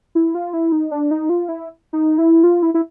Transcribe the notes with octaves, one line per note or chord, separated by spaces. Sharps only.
E4
F4
E4
D#4
D4
D#4
F4
E4
D#4
E4
F4
E4
E4